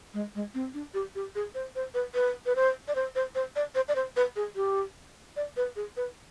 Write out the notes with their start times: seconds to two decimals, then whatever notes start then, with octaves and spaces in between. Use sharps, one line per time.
0.14 G#3
0.35 G#3
0.54 C4
0.74 D4
0.94 G4
1.15 G4
1.35 G#4
1.55 C5
1.75 C5
1.94 B4
2.14 B4
2.46 B4
2.56 C5
2.88 D5
2.95 C5
3.15 C5
3.35 C5
3.56 D5
3.75 C5
3.88 D5
3.96 C5
4.16 B4
4.36 G#4
4.56 G4
5.36 D5
5.57 B4
5.76 G#4
5.97 B4